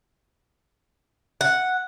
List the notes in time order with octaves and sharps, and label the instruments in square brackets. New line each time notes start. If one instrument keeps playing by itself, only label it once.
[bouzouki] F#5